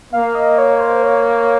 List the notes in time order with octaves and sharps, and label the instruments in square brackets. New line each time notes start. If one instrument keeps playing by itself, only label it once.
[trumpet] A#3 [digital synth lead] F5
[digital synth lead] D#5
C#5
C5
C#5